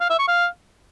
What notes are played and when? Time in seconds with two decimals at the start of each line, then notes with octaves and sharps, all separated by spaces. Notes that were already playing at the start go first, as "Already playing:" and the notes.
0.01 F5
0.10 E5
0.19 C#6
0.28 F5